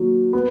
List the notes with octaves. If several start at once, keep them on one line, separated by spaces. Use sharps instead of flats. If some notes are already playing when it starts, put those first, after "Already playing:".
Already playing: D#3 F#3 A#3
B3